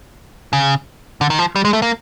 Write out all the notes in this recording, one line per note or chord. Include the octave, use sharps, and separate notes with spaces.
C#3
D3
D#3
F3
G3
G#3
A3
A#3